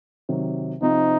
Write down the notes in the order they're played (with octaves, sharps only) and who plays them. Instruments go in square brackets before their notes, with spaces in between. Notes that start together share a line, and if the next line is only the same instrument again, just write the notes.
[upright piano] C3 D#3 F#3
[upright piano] C3 F3 C4 [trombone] D#4